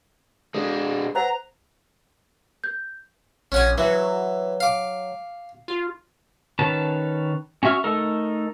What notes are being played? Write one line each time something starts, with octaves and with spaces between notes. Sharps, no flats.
G#3 D4 A4
B4 C5 F#5 A#5
G6
A#1 C#4 F#5 G#5
E3 F#3
F5 D6
F4
D#3 C#4 B4 A5
C#4 F#4 E5 C#6 F6
A3 D#4 A4 A#4